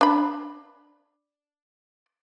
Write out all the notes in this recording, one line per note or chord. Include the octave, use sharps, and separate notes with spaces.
D4 B5